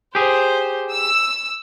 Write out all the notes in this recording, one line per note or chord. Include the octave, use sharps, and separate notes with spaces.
G4 G#4 C5
E6